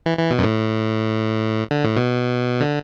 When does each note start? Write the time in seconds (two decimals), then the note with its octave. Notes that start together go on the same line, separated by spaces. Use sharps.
0.06 E3
0.18 E3
0.30 B2
0.39 F#2
0.43 A2
1.71 D3
1.84 A2
1.96 B2
2.60 D3